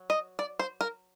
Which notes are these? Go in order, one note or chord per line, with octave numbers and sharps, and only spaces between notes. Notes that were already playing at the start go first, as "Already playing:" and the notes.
Already playing: F#3
D#5
D5
C5
A#4